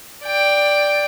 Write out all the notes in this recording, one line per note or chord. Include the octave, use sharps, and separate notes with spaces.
D5 G5